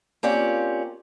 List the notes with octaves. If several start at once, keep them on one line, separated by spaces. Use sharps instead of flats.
A#3 C4 C#4 F4 G4 D5